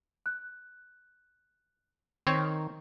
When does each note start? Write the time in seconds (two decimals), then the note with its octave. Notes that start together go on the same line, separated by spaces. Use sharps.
0.26 F#6
2.27 D#3 C4 C#5 C#6